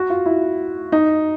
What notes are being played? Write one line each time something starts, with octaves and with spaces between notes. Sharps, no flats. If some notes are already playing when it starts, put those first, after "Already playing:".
Already playing: F#4
F4
E4
D#4